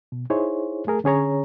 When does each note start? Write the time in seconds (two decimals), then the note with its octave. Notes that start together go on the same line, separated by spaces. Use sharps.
0.12 B2
0.30 D#4 E4 G#4 C5 C#5
0.87 A3 G#4 A#4
1.04 D3 C#4 G#4 C#5 A#5